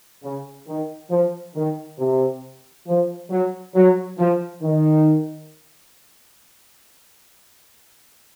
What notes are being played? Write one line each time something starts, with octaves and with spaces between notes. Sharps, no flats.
C#3
D#3
F3
D#3
C3
F3
F#3
F#3
F3
D#3